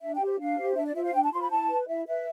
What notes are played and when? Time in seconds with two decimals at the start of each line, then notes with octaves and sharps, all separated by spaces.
0.02 D4 E5
0.15 G5
0.21 G4 C5
0.39 D4 F5
0.58 G4 C5
0.76 D4 E5
0.86 D5
0.95 F4 C5 E5
1.04 F5
1.13 D4 G5
1.23 A5
1.32 F4 C6
1.37 C5 B5
1.51 E4 A5
1.70 B4
1.87 E4 E5
2.07 B4 E5